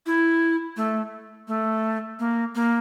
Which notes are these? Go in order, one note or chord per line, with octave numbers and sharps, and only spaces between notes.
E4
A3
A3
A#3
A#3